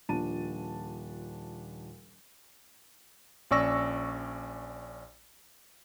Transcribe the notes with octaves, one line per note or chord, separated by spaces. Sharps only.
D#1 F3 D4 A5 D#7
A#1 C#4 D5 C#6 E6 A#6